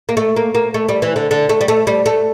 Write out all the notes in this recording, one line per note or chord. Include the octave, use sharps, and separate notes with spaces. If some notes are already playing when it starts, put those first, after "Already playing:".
A#3
A3
A#3
A#3
A3
G3
E3
D3
D3
A3
G3
A3
G3
A3